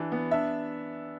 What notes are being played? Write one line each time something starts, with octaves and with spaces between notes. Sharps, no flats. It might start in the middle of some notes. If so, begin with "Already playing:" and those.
Already playing: E3 D4
B3
D4 E5